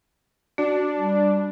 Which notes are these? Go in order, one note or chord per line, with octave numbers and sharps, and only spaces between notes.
D4 F#4
G3